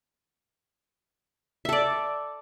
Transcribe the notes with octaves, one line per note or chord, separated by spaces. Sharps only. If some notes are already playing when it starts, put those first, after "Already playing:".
A4 D5 E5